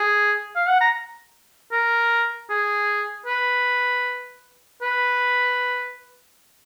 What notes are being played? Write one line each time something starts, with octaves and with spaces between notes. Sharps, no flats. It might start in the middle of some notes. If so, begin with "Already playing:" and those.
Already playing: G#4
F5
F#5
A#5
A#4
G#4
B4
B4